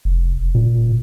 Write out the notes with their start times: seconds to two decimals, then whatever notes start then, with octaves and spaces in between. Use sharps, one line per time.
0.05 F1
0.55 A#2